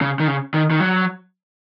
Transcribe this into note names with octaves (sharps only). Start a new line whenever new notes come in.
C#3
D#3
C#3
D#3
D#3
F#3